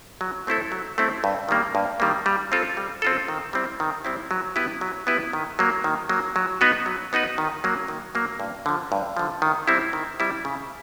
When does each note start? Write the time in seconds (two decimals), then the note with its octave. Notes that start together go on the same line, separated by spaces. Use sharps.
0.21 F#3
0.47 A3 C4 E4 A4
0.72 F#3
0.98 A3 C4 E4 A4
1.24 G2
1.49 D#3 G3 A#3
1.75 G2
2.00 D#3 G3 A#3
2.26 G3
2.52 C4 F4 A4
2.77 G3
3.02 C4 F4 A4
3.28 D#3
3.53 G3 C4 E4
3.80 D#3
4.05 G3 C4 E4
4.31 F#3
4.56 B3 E4 G4 B4
4.81 F#3
5.07 B3 E4 G4 B4
5.33 D#3
5.59 F#3 A#3
5.84 D#3
6.09 F#3 A#3
6.36 F#3
6.61 B3 D#4 F#4 B4
6.86 F#3
7.13 B3 D#4 F#4 B4
7.38 D#3
7.64 F#3 A#3
7.88 D#3
8.15 F#3 A#3
8.40 G2
8.66 D3 F3
8.92 G2
9.17 D3 F3
9.42 D#3
9.68 G3 C4 E4
9.93 D#3
10.20 G3 C4 E4
10.45 C#3